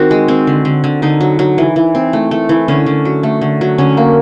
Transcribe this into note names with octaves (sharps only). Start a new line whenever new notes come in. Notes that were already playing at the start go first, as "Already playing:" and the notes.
Already playing: D#3 C4 F#4
G#3
C4
D3
D3
D3
D3 D#4
F#3
F#3
E3
E3
C4
A3
A3
E3
D3 C#4
D3
F#3
A3
D3
F#3
D3 C#4
A#3